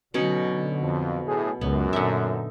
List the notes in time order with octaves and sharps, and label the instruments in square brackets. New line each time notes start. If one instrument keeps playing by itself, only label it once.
[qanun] B2 C#4 D#4 [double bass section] D3 F#3
[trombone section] F2
A2 G#4
[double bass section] C#2 [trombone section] F#2 [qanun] B3
[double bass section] A#2 [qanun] D3 D#4 E5